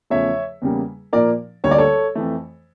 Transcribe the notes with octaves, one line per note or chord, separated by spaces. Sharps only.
E2 C#3 F3 A3 C#5 E5
E2 C#3 G3 A#3
A#2 F3 A#3 A#4 D5
D2 D3 G3 A#3 C#5
D5
A4 C#5
F2 E3 A3